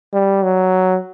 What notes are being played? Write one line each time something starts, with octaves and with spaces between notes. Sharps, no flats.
G3
F#3